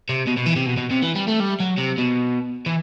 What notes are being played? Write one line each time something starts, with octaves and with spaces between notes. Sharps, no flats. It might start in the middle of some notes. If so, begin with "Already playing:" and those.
C3
B2
B2
E3
C3
B2
B2
C3
E3
G3
A3
G3
F#3
C3
B2
E3